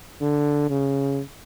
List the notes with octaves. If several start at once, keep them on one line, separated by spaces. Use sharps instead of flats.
D3
C#3